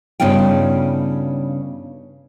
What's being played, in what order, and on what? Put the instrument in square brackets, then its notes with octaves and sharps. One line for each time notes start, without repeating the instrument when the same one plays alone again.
[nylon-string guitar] G2 C#3 B3 D#4 F4 G5